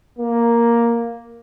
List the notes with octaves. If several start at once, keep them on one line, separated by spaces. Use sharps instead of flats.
A#3